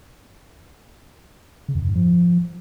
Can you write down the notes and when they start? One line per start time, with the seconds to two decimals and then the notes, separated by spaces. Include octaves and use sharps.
1.69 C#3
1.75 F2
1.82 F#2
1.89 G#2
1.95 F3